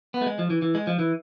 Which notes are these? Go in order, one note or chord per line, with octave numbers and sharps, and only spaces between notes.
B3
A3
G#3
F3
E3
E3
G#3
F3
E3